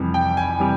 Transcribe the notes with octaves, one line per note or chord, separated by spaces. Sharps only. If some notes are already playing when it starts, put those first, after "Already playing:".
Already playing: F2 C3 E3 G3
G5
G#5
C3 E3 G3